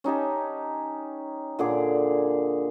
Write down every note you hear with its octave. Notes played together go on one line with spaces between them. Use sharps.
C#4 D#4 G4 A5
A#2 D3 G#4 D6